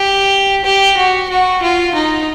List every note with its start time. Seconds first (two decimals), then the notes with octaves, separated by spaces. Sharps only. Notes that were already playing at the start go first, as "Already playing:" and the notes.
Already playing: G4
0.65 G4
0.97 F#4
1.29 F#4
1.62 F4
1.95 D#4